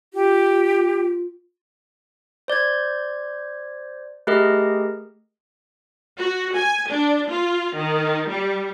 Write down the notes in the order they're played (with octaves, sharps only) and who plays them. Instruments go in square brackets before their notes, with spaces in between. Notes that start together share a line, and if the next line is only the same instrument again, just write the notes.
[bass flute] F4 [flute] G4
[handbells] C5 D5 G6 G#6
A3 G4 G#4 A#4 D#5
[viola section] F#4
G#5
D4
F4
D#3
G3